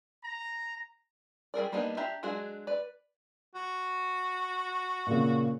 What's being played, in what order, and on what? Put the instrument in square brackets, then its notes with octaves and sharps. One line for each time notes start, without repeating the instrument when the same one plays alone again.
[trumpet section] A#5
[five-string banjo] G3 G#4 A#4 D5
G3 A#3 B3 D4 D#4
D4 G4 E5 A#5
F#3 G#3 D4 F#4 G#4
B4 D5
[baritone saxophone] F#4
[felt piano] A#2 C#3